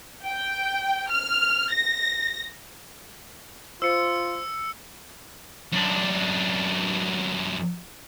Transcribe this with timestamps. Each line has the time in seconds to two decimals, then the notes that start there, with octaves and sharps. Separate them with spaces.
0.25 G5
1.10 F6
1.72 A#6
3.82 F4 C5 E6 C#7
5.73 F#2 D4